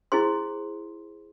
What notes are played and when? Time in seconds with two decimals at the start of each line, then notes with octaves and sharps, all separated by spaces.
0.12 E4 G#4 C5 C6